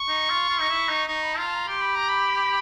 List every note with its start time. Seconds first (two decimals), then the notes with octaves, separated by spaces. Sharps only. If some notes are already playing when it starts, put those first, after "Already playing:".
Already playing: C#6
0.08 D#4
0.29 F4
0.49 F4
0.60 D#4
0.69 E4
0.89 D#4
1.07 D#4 C#6
1.23 B5
1.33 A5
1.38 F4 A#5
1.47 A5
1.53 A#5
1.68 G4 C6
1.81 B5
1.95 A#5
2.09 B5